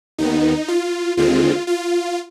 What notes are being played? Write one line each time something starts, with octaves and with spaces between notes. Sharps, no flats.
D#2 D#3 B3 D#4
F4
D#2 D3 G#3 C4 F4
F4